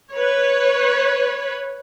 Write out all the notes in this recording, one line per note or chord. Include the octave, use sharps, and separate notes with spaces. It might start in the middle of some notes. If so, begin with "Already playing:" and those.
B4 C#5